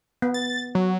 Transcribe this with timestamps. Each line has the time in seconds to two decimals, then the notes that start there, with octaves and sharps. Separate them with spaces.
0.22 B3
0.34 A6
0.75 F#3